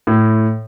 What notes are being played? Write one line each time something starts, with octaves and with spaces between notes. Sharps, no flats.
A2